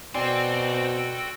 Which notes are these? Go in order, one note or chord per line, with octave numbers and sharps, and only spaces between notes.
B2 C4 F#4 A4 D5 G5 G#5 C6